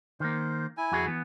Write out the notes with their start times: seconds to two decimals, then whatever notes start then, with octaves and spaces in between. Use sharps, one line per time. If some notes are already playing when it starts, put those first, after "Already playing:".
0.20 D#3 A#3 C5
0.77 E4 G#5
0.92 F2 F#4 G#4
1.06 E3 B3